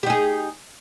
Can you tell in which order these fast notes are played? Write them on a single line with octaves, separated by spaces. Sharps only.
G4 D#4 G#4